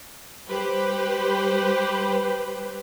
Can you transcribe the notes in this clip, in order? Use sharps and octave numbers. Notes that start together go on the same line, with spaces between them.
G3 G4 B4 C5